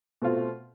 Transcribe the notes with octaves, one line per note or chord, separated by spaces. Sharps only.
B2 A3 C4 F4